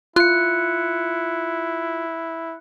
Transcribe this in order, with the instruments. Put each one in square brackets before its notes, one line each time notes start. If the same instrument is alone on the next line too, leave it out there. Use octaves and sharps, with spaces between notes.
[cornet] E4 [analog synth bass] F4 [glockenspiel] F#6 C#7